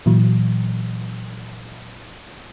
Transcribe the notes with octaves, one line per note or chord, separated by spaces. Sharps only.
A#2 E3 F#3